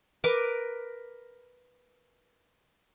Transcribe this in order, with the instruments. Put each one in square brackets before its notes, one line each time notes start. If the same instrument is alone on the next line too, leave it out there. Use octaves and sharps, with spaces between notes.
[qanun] A#4 B4 D6